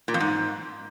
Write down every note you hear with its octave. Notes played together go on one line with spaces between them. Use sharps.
A#2
F2
G#2